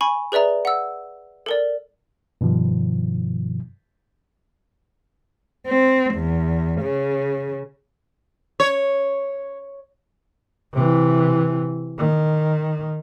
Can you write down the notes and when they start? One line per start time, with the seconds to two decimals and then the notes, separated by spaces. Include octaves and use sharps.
0.01 G#5 B5 C#6
0.32 G#4 B4 D5 E5 A#5
0.65 F#5 E6
1.46 A4 A#4 D5
2.41 G2 B2 D#3 F3
5.67 C4
6.14 E2
6.81 C#3
8.60 C#5
10.73 C3 E3
11.99 D#3